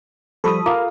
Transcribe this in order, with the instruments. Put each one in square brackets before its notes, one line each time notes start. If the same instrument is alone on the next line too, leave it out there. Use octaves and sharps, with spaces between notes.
[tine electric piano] F3 G3 [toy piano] F4 G4 [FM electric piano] A4 B5 D#6
[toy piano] F4 A#5 D6 [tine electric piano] A#4 [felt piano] F5